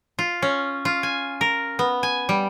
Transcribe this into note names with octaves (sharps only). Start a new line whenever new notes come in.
F4
C#4
F4
G#5
A#4
B3
G#5
G3